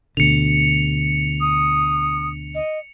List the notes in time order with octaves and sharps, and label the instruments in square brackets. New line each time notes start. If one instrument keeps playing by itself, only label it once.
[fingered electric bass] D2 B2 D3 [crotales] C#7 F7
[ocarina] D#6
D#5